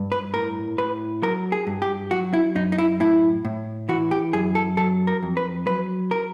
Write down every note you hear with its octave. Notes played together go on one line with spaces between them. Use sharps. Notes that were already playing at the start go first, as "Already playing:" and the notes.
Already playing: G2
B4
A2 A#4
A2 B4
F#3 A#4
G#4
G2
G4
F#3 F#4
E4
F#2 D#4
D#4
E4
A2 E4
A2
E3 F#4
G4
F#2 G#4
A4
F#3 A4
A#4
F2
B4
F#3 B4
A#4